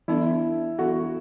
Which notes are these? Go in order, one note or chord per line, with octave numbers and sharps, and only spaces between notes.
E3 B3 D4 E4 A4
E3 B3 D4 F#4 A4